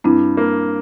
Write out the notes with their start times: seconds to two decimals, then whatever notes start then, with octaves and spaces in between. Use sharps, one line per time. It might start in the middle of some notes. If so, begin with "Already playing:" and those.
0.04 G2 C4 E4
0.37 A#3